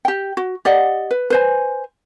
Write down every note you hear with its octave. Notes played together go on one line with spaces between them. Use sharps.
G4 G5
F#4
G4 D5 D#5 F#5
B4
B4 C5 G#5